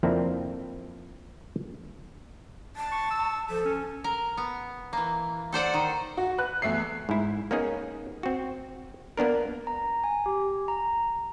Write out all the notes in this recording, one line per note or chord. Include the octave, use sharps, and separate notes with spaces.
F2 F3 A#3 C4 D4 E4
A5
C#6
E6
F3 A4
C#4
A#4
B3
E3 A#3
A4 C5 D5 F#5
D#3
F#4
B4 F#6
E2 A3 E5 C7
G#2 E4
A#3 B3 C#4 D#4 G#4
C4 F#4
A#3 B3 D4 A#4
A#5
G#5
G4
A#5